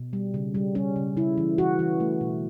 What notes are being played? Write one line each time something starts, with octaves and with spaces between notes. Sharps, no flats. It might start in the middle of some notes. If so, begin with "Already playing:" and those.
Already playing: B2
G3
C#3
G3
G3 C#4
C#3
C#3 E4
E3
E3 F#4
E3
A3
B2